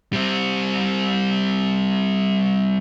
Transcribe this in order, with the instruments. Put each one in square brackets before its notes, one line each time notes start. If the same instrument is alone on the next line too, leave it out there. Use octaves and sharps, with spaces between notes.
[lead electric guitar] G3 C4